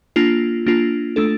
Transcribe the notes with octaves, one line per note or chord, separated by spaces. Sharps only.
A#3 D4 F4
A#3 D4 F4
A3 D4 A4